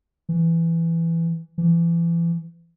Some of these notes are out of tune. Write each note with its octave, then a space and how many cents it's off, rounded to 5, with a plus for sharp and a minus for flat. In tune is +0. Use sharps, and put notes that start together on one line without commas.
E3 +10
E3 +35